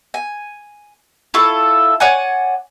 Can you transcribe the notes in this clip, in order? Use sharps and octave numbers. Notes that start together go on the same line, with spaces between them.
G#5
E4 F4 A4 C#6
C#5 D5 F#5 G#5